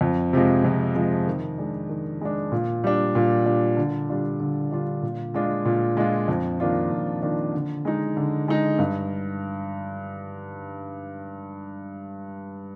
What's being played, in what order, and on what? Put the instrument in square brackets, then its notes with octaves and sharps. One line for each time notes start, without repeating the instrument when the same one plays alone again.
[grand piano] F2
C3 F3 G#3
F2
C3 F3 G#3
D#3
G#3 D4
D#3
G#3 D4
A#2
G3 D4
A#2
G3 D4
D3
G3 D4 F4
D3
G3 D4 F4
A#2
G#3 D4 F4
A#2
G#3 D4 F4
F2
D#3 A#3 D4 F4
F2
D#3 A#3 D4 F4
D3
G#3 D#4
D3
G#3 D#4
G2